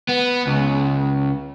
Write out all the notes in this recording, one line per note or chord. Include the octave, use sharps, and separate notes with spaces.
B3
C#2